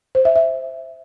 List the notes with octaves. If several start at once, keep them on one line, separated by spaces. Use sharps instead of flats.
C5
E5
E5